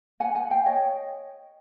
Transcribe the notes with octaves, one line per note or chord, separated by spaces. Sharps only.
F#5 G#5
F#5 G#5
F5 G5
C#5 D#5